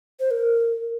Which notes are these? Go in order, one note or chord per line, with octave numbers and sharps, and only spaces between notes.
C5
A#4